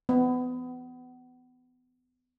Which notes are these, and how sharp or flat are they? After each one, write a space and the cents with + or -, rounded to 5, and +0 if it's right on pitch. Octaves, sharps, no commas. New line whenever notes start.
B3 +30